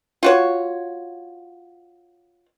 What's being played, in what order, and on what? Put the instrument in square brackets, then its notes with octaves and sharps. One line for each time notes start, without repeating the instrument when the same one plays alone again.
[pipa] F4 F#4 C#5